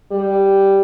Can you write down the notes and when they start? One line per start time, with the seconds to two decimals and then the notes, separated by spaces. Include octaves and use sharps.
0.11 G3